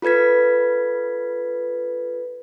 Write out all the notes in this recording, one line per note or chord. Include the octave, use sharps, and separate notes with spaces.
F4 A4 B4 G#6 B6